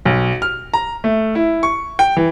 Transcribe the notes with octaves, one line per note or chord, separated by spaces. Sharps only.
B1
F6
A#5
A3
E4
C#6
G5
E3